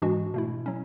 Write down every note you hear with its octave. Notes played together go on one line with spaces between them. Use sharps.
G#2 E3 G#3 D4 F#4
B2 A3 E4
F#3 C#4